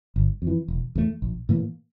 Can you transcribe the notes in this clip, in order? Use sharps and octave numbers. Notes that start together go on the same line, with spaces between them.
G1
F2
E3
E1
E2 D3 A3
A#1
A2 E3 A#3